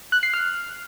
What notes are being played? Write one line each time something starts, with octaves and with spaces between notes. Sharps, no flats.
F#6
C7
F6